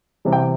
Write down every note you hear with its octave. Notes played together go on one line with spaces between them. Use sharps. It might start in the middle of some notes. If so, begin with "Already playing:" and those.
C3 E3 G3
G5